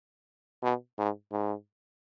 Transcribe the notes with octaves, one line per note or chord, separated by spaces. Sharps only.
B2
G#2
G#2